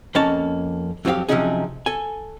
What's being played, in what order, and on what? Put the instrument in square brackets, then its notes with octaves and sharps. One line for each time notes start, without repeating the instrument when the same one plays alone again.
[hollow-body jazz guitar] F2 A#3 C#4 D#5 A5 A#5
F2 F#3 C4 F4 G4 F5
C3 F3 F#3 C#4 D#4 G#4
A4 G#5